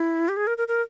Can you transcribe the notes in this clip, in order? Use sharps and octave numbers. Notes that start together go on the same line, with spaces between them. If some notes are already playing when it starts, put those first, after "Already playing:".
Already playing: E4
G4
G#4
A#4
A#4
A#4